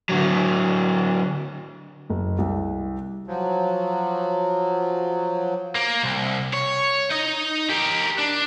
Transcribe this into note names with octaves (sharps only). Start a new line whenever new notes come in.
D3 F#3
F#1
C2
F3 F#3
A#3
C2
C#5
D#4 D#5
G4 A#4
D4